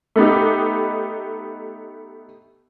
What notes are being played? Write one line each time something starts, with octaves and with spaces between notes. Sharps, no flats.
A3 B3 D#4 G4